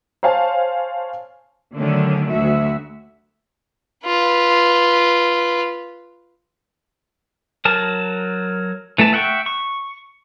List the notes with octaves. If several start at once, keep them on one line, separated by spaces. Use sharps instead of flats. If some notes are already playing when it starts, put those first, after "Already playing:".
C5 C#5 F5 G#5 A5
D3 D#3 F#3 A3 C#4 D4
D2 F#4 E5
F4 B4
F#3 A#4 A5
E3 A3 E4 A5
E5 F#5 G5 C#6
C#6